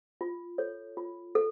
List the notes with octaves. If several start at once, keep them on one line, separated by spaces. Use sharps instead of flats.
F4
A4 C#5
F4
A4